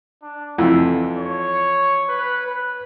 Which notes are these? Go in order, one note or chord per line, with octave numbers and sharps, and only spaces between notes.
D4
F2 E3 A4
C#5
B4
B4